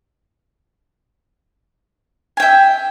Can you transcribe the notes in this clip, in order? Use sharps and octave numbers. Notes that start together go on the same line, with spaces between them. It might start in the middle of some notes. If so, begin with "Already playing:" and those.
E5 G5 G#5